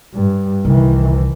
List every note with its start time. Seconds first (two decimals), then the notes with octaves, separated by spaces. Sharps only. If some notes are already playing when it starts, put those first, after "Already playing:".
0.15 G2
0.65 C2 D#3 E3